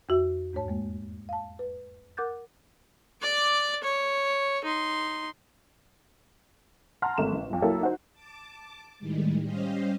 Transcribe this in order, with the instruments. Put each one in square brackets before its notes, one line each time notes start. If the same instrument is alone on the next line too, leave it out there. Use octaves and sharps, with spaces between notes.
[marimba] F2 F#4 E5
E2 G#2 A3 C#5 A5
G#3 A#3
F5 A5
B4
A#4 F#5 D6 F#6 G6 A6
[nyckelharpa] D5 D6
C#5
D#4 C6
[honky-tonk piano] F#5 A5 A#5 C6 F6
G#1 A3 E7
A1
B1 F2
F#3 A#3 E4 A4 A#4
D#4 F#4 C5
[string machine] A5 D6
A2 D#3 G3 G#3
G3 C#4 G4 C5 D#5 F5